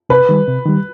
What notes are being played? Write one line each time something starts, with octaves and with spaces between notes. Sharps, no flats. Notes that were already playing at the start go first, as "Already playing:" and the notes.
C3 B4
D#3 G3
C3
D#3 G3